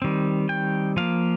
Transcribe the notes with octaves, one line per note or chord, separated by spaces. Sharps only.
D#3 G3 C4
G5
F3 A#3 F5